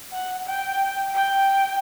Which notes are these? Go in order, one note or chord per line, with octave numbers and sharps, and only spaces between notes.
F#5
G5
G5